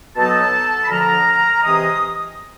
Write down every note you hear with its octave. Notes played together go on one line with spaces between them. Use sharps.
B2 F#3 B3 D#4 A4 A5
B5
D2 D3 F3 A#4 A#5
C3 E3 G#3 D#5 D#6